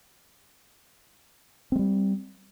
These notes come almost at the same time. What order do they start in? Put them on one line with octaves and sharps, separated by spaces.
C4 G#3 G3